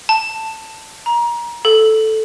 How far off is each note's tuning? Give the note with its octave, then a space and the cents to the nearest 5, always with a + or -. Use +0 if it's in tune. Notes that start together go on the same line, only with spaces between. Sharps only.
A5 +10
A#5 +25
A4 -5